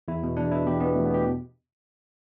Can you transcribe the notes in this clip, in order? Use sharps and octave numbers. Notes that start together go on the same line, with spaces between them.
E2 E4
B2
E2 D4
B2 E4
E2 G4
B2 B3
E2 A3
B3
B2 G4